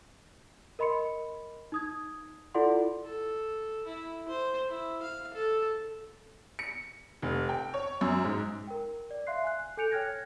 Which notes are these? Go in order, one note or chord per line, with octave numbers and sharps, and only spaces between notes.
A#4 D#5 B5 C6 C#7
D#4 D#6 G#6
E4 F4 A4 D5 F#5 C6
A4
E4
C5
E4
F5
A4
C#7
F1
G5
C#5
F#2
G#2
A#4 G5
D5
E5 F5 C6 F#6 C7
G#5 F#6
A4 G#5 G6 C#7 D7 F7
C#5 G5 F6 F#6 G#6 A#6